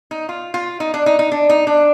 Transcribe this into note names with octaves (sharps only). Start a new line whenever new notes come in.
D#4
F4
F4
D#4
D4
D#4
D#4
D4
D#4
D4